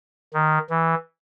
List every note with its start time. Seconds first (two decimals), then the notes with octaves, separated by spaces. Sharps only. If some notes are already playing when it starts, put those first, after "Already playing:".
0.34 D#3
0.70 E3